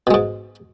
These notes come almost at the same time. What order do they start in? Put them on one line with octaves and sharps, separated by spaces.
B2 G#3 G#2